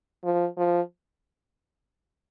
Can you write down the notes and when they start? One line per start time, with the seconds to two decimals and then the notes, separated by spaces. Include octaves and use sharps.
0.24 F3
0.57 F3